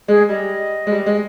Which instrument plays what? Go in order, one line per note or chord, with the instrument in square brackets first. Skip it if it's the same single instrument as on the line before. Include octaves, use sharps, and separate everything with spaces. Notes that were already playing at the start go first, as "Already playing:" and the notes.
[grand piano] G#3 [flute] G#4
[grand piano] G3 [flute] D#5
[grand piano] G#3
G3
G#3